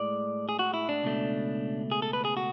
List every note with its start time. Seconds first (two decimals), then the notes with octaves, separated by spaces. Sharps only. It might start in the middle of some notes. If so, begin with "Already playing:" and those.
Already playing: A2 G#3 D5
0.49 G#4
0.59 F#4
0.74 E4
0.89 D4
1.03 C#2 B2 A3
1.92 G#4
2.02 A4
2.13 B4
2.25 G#4
2.37 F#4